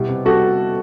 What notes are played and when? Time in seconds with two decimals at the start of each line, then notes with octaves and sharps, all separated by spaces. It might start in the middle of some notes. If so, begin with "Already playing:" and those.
Already playing: B2 G3 E4 G4
0.09 C3
0.25 G3 F#4 A4